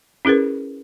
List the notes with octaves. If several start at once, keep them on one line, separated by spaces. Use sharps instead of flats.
C#4 E4 G#4 A#4 B4